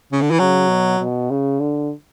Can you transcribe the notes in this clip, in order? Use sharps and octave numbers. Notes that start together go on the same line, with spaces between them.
C#3
D3
E3
C#3 F#3
B2
B2
C#3
D3